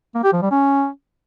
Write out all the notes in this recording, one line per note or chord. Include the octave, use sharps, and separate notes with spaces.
A#3
G4
F3
G3
C#4